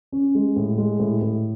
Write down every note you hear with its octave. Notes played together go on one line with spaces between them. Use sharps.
C#4
G#3
A2
G#3
A2
A2